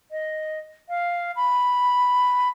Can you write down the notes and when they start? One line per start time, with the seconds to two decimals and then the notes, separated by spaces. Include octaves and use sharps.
0.11 D#5
0.89 F5
1.36 B5